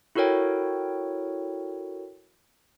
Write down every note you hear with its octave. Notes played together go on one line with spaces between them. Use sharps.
E4 F#4 A4 A#4 C#5 G5